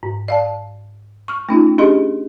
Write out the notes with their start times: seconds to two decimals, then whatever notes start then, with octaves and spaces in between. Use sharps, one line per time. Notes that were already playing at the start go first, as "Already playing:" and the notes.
0.03 G#2
0.28 D5 F5 A5
1.28 C#6 F6
1.49 A3 C#4 D#4 F4
1.78 C#4 D4 G4 G#4 D#5 C6